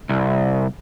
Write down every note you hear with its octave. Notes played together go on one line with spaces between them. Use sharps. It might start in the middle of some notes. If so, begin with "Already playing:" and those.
C2